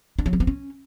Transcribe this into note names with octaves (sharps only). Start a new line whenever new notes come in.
D4
F#3
C#4
B3
C#4